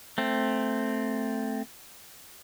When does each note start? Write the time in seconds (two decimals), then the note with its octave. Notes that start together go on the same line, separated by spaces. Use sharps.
0.18 A3 C4